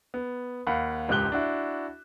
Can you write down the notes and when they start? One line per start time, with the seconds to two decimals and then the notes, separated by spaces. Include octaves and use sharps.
0.14 B3
0.67 D#2 F5 F#5 B5
1.08 E1 C#2 G#2 G4 F#6 G7
1.32 D4 E4 F#4